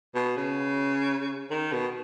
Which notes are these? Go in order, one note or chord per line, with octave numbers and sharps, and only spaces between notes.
B2
C#3
D#3
B2